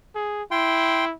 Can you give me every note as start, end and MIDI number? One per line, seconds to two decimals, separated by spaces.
0.15 0.43 68
0.51 1.14 64
0.51 1.05 79
0.51 1.05 84